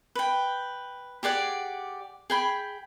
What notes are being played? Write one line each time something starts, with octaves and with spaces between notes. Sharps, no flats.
B4 G5
G4 G#4 D5 F#5
G#4 G5 B5